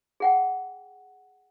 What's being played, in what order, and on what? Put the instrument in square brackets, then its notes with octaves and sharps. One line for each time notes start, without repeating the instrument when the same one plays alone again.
[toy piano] G#4 F#5 G5